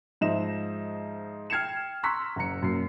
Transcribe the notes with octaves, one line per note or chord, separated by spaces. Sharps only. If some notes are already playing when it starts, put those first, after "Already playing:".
G#2 F3 C5 D#5 E5 E7
G5 F6 G#6 C7 C#7 E7
A#5 C6 C#6 E6 F#6 B6
F#1 A#5 C#7
F#2 A#3 C7